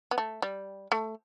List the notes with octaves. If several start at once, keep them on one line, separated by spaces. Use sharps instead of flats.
B3
A3
G3
A3